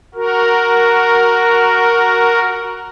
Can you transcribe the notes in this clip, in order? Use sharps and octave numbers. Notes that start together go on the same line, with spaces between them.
F#4 A#4